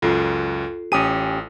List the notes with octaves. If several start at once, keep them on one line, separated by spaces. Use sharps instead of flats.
C#2 F#2 F4 A4 C7
A1 C#4 G4 D#6 D#7